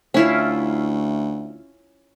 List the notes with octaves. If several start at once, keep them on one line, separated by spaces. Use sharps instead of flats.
D2 C#4 E4 F4